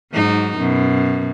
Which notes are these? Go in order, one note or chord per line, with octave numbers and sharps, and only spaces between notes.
G#2 F#3 D#4
F#2 B2